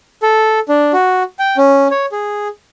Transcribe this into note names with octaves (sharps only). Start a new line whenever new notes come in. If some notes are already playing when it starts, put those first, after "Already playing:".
A4
D4
F#4
G5
C#4
C#5
G#4